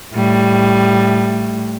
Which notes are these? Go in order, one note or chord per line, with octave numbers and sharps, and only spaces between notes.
A2 G3